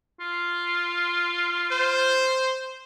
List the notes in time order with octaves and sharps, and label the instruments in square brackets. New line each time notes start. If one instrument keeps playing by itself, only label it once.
[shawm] F4
[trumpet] C5